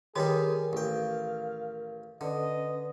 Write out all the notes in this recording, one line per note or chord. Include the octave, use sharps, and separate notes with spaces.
D#3 G3 D#4 G4 G#4 A#4 C#5
A1 F5 G5
D3 C#4 B4 D5 D#5